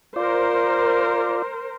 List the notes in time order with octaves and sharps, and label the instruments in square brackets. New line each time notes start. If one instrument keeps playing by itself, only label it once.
[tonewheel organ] F4 D5 [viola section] A#4 C5